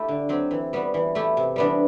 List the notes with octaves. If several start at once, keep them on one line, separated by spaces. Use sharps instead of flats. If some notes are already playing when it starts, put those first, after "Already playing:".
Already playing: A3 E4 G4
D3
F#3 C4 G4
E3
G3 B3 F#4
E3
A3 E4 G4
C3
E3 G3 B3 D4